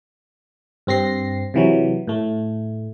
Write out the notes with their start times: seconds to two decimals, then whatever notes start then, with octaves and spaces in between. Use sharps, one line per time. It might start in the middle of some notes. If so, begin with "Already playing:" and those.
0.87 G2 C4 A#6 C7
1.54 C3 E3 F#3
2.07 A2 A3